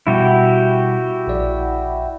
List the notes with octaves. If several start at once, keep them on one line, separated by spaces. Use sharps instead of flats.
B2 G3 E4 F#4 G4
A#1 D5